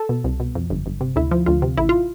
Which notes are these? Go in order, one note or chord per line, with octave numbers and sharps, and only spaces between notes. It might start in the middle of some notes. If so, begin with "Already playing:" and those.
Already playing: A4
B2
C2
B2
F2
G1
G1
C3
D2 E4
F3
D2 F4
C3
A1 E4
F4